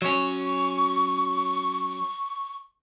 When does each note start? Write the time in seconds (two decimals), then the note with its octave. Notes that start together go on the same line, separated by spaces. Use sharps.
0.02 F#3 C#4 C#6